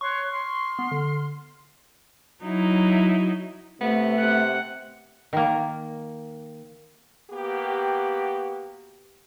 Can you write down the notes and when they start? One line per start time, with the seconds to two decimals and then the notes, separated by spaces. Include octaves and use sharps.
0.01 C#5 C6 C#6 F#6
0.32 C6 F6
0.79 B3
0.91 D3
2.43 F#3 D#4 E4
3.81 C3 A3 B3
4.18 C3 F#5
5.33 D#3 A#3
7.31 A#3 B3 F#4 G4